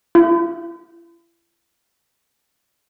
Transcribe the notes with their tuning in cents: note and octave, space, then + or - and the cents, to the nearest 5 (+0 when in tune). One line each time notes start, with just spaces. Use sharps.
E4 +45